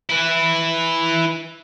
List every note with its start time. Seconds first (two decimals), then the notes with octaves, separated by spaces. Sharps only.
0.10 E4 B4